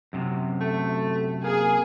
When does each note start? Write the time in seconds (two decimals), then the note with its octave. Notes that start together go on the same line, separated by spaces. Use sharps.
0.13 F#2 C3
0.60 A3
1.44 A#3 G#4